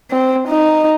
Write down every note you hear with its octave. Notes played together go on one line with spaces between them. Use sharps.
C4
D#4